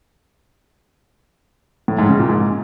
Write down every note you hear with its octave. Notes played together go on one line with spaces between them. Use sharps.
A2
G#2
C#3
A#2
G#2